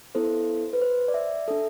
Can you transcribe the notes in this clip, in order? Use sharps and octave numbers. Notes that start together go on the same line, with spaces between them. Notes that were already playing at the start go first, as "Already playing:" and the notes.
B3 E4 A4 C5
B4
C5
D5
E5
D4 A4